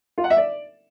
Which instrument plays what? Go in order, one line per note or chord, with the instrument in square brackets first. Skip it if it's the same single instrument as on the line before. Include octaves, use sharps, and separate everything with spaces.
[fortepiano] F4
F#5
E5
D5